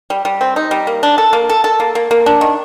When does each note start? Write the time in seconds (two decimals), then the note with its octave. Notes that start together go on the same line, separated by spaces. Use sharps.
0.10 G3
0.25 G3
0.41 C4
0.56 D#4
0.71 G3
0.87 A#3
1.03 D4
1.18 A4
1.33 A#3
1.49 A4
1.64 A4
1.80 A#3
1.95 A#3
2.11 A#3
2.26 D4
2.41 D#3